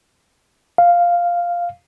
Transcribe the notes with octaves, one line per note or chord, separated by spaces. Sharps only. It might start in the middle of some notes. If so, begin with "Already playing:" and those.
F5